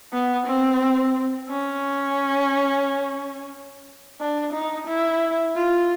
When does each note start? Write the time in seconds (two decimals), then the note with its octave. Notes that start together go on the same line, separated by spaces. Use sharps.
0.13 B3
0.47 C4
1.49 C#4
4.20 D4
4.54 D#4
4.88 E4
5.56 F4